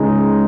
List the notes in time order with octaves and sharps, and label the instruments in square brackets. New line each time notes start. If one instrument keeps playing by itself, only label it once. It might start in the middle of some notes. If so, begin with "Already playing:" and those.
Already playing: [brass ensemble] C#2 C#3 G#3 D#4